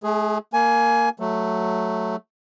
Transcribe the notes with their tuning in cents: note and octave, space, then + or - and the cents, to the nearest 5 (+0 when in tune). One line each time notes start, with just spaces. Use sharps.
A3 -45 G#4 +0
A#3 -10 G#5 +20
F#3 +0 A3 +0